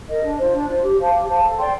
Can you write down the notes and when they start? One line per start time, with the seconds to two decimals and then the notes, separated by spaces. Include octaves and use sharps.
0.08 A#4 D#5
0.23 D4
0.38 F4 C5
0.53 D4
0.68 F4 C5
0.83 G4
0.98 C5 F5 A5
1.13 G4
1.28 C5 F5 A5
1.43 A4
1.58 D5 G5 C6